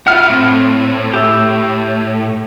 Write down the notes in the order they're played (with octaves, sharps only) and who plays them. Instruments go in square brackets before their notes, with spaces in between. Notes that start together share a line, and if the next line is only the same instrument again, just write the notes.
[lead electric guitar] E4 F4 [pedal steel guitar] F#5 F6
[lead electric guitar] A2 [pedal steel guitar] C4
[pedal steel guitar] G4 E5